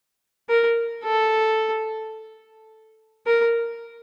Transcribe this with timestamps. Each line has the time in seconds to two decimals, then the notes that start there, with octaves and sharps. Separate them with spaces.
0.49 A#4
1.04 A4
3.27 A#4